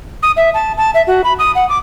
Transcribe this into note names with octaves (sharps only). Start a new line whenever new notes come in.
D#6
E5
A5
A5
E5
F#4
B5
D#6
F#5
D6